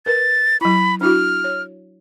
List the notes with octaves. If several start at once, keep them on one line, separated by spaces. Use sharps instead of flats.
A#4 B4 A6
F#3 E4 B5
D4 E4 F#4 F6
C#5